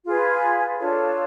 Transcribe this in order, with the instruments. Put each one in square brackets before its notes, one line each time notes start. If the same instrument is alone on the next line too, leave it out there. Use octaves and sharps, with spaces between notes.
[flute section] F4 G#4 B4
D4 F4 A4 C#5